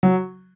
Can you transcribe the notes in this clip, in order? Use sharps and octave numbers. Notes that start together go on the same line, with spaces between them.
F#3